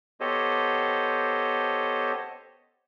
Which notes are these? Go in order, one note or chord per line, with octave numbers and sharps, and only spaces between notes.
B3 G4 A4 C5 C#5 D#5